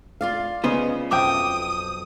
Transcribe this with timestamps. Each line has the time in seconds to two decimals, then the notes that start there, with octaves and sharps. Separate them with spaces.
0.21 F4 D5 F5
0.64 C#3 B3 C5 D#5
1.11 B1 F2 E5 G5 D6 D#6